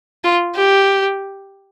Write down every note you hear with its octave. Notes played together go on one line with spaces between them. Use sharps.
F4
G4